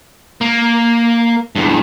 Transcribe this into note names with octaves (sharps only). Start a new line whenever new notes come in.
A#3
E2 G2